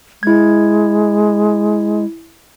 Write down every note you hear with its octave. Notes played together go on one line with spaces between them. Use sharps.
G#3 E4 G#6